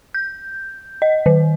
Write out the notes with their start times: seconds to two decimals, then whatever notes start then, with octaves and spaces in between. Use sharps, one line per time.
0.14 G6
1.02 D#5
1.26 D#3